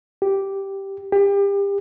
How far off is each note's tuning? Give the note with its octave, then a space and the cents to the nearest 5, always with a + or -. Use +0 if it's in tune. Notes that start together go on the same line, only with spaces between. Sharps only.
G4 -5
G4 +30